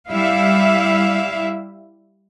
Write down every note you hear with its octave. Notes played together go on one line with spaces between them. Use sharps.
G3 E4 E5 F5